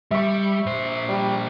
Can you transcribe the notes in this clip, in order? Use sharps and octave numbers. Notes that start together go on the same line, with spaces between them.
G3 E5 C#6
A#2 C5
G3